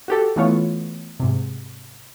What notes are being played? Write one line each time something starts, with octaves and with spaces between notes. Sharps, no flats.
F#4 G4 A4
E3 A3 B3 F4 C#5
G#2 C3